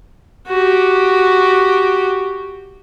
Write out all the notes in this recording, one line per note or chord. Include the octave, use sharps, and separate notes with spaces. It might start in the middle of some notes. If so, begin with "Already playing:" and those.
F#4 G4